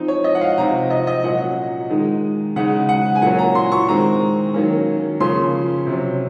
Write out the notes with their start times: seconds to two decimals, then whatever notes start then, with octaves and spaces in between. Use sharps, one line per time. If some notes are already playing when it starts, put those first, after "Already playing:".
Already playing: F3 C4 D#4
0.08 C#5
0.24 D#5
0.35 F#5
0.41 F5
0.58 C3 F3 C4 D#4 A#5
0.90 D#5
1.07 D#5
1.24 A#2 F#3 C#4 F#5
1.90 D#3 G#3 D#4
2.56 C#3 G#3 D#4 F#5
2.89 F#5
3.15 G#5
3.22 A#2 F#3 A#3 C#4 F#5
3.39 A#5
3.55 C6
3.72 C#6
3.88 D#3 G#3 C4 A#5
4.54 D#3 F#3 A#3 C#4
5.20 C#3 F3 A#3 C#4 C6
5.86 C3 F#3 C#4